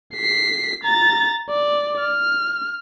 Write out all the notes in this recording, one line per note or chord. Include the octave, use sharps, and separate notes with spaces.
B6 C7
A#5 A6
D5
F6